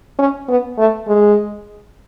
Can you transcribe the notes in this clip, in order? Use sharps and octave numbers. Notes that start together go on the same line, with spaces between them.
C#4
B3
A3
G#3